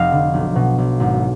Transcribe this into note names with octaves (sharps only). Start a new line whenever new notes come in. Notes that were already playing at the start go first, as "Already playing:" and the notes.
Already playing: F1 D#5 F5
D3
B1
B2
B1
G#1